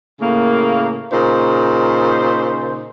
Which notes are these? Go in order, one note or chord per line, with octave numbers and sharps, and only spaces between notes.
A2 C#3 A#3
A#2 C#3 D#4 C5